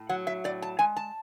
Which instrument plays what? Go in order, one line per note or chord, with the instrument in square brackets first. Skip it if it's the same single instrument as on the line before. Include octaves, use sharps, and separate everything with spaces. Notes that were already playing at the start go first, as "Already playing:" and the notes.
Already playing: [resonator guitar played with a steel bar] A2
F#3 F#5
E5
A2 D5
A5
G#3 G#5
A5